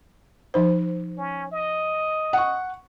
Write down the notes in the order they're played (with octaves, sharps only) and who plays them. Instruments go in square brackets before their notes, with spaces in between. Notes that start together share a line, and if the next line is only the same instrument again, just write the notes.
[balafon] F3 D#4 C5
[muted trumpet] C#4
D#5
[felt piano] F#5 C#6